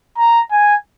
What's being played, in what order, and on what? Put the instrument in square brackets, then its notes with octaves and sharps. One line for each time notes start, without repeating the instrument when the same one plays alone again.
[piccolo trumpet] A#5
G#5